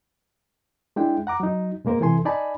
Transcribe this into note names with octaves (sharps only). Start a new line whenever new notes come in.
G#3 D4 E4 G5
F#5 A#5 D6
F#3 D#4
B2 G#3 A#3 A#4 C5
C3 E3 A4 G#5 C6
D#4 D5 G#5 A5 B5